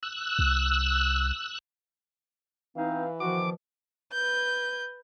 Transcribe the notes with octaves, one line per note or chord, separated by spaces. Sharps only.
E6 F#6
C2
E3 B3 C4 D#4 F5
B2 D#3 F3 F#4 D6
B4 G6